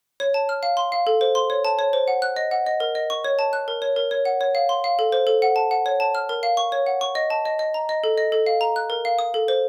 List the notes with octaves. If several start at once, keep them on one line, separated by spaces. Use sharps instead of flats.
C#5
A5
F6
F5
C6
F5
A4
C5
C6
C#5
A5
C#5
C5
F#5
F#6
D#5
F#5
D#5
A#4
D#5
C#6
C#5
A5
F#6
A#4
C#5
A#4
C#5
F#5
C#5
F5
C6
F5
A4
C5
A4
F#5
A5
F#5
C#5
A5
F6
A#4
F5
C#6
C#5
F#5
C#6
D#5
A5
D#5
D#5
A#5
D#5
A4
D#5
A4
F5
A#5
F#6
A#4
F5
D#6
A4
C5